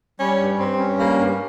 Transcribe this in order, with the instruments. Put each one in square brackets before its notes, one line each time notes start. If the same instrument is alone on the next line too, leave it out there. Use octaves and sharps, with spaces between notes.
[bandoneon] G3 [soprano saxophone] C#4
[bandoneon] G2
[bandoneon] G2 [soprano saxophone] C4
[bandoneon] C#4
[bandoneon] G3 [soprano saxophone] A#3
[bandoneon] G2